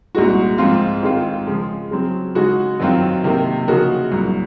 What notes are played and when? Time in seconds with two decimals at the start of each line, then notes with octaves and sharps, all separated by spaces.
0.15 C2 A#2 G#3 D#4 F#4
0.58 G#2 F3 C4 F4
1.02 G#2 D#3 G#3 C4 F4
1.47 C#3 F3 G#3
1.91 C#3 F#3 C4
2.35 C#3 G#3 D#4 F#4
2.80 F#2 D#3 F#3 C4 F4
3.24 C3 D#3 A#3
3.68 C#3 F3 A#3 D#4 F#4
4.12 C2 A#2 F#3